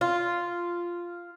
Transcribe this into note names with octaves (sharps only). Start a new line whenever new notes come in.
F4